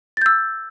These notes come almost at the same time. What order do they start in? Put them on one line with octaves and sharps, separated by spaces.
A6 G6 E6